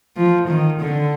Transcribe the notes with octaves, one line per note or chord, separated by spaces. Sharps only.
F3
D#3
D3